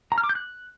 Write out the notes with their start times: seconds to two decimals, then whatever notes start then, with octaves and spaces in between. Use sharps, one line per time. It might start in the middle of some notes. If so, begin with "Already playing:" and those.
0.12 A#5
0.18 F6
0.24 D6
0.29 G6
0.35 F#6